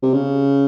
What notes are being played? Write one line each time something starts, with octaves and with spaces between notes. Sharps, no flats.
C3
C#3